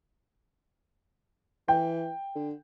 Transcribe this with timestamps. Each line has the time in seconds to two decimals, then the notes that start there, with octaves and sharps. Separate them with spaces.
1.68 E3 G5
2.35 D3